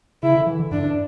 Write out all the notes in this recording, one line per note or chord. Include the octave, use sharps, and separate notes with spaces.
C#3 E4
D3
E3
D3
G2 D4